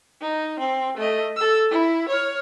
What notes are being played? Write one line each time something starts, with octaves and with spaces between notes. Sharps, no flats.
D#4
C4
A3 D#5
A4 E6
E4
C#5 F6